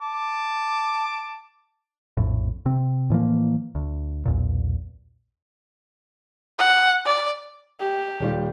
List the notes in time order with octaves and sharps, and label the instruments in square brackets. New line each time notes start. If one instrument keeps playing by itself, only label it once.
[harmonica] A5 D6
[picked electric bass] A#1 F2 A2
C3 C4
A2 E3 F3 A#3
D2
B1 E2 A#2
[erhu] F#5
D5
[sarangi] G4
[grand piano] D#1 G3 F4